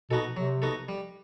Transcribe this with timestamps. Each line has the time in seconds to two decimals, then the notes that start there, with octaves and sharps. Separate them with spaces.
0.11 B2 B3 D#4 F#4 A4
0.37 C3 F#3
0.62 B3 D#4 F#4 A4
0.89 G3